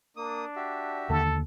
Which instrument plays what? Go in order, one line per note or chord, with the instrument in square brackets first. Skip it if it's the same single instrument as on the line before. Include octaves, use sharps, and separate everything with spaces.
[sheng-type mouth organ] A#3 D#6 [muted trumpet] D4
[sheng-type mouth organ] F#4 G4 E5
[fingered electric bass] D#2 D3 A#3 [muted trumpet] A4